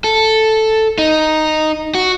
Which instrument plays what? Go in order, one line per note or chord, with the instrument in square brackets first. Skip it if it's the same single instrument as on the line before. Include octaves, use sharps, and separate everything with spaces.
[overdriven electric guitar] A4
D#4
F#4